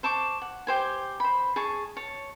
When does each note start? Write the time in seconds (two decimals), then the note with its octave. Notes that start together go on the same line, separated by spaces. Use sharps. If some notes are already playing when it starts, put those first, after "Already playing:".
0.03 C5 A5 C#6 D6
0.42 F#5
0.67 G4 C5 G#5
1.20 C5 B5
1.56 G#4 A5 C#6
1.97 C#5 A5